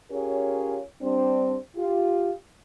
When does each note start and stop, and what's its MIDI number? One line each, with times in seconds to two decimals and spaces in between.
0.10 0.79 61
0.10 0.79 65
0.10 0.79 67
0.10 0.79 68
0.10 0.79 70
0.10 0.79 73
1.01 1.55 55
1.01 1.55 60
1.01 1.55 62
1.76 2.31 65
1.76 2.31 67